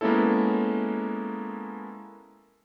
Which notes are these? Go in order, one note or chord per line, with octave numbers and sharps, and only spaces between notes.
G#3 A#3 B3 C#4 E4 A4